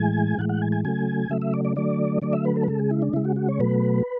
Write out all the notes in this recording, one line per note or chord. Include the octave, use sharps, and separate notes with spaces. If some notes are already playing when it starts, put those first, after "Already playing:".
Already playing: A2 E3 G#3 G#5
A2 E3 G#3 F#5
F#5
G#5
G#5
C#3 F#3 A3 G#5
C#3 F#3 A3 E5
E5
D5
D5
D3 F#3 A3 D5
D3 F#3 A3 D5
E5
B4
A4
B4
C#3 G#3 A4
G#4
E4
D4
C#3 G#3 E4
F#4
F#4
C#5
B2 F#3 A3 B4